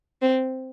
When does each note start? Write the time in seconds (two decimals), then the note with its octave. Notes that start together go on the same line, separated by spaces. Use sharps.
0.22 C4